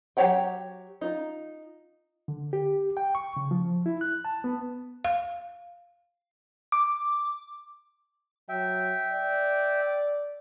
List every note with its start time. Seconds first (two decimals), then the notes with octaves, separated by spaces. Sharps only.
0.17 F#3 G4 C#5 F#5 G5
1.01 D#4 F4
2.28 D3
2.53 G4
2.97 G5
3.15 C#6
3.37 C#3
3.51 F3
3.86 E4
4.01 F#6
4.25 A5
4.44 B3
5.05 F5
6.72 D6
8.49 F#3 E5 G5
9.12 D5